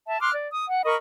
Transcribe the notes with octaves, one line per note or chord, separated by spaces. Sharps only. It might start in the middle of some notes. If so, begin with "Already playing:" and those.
E5 A5
C6 D6 F6 F#6
D5
D#6
F#5
A#4 D#5 B5 C#6